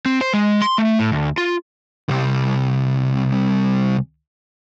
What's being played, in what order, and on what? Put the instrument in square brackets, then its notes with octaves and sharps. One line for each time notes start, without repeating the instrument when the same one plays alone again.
[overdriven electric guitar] C4
C5
G#3
C6
A3
A2
D2
F4
[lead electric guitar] C2 G3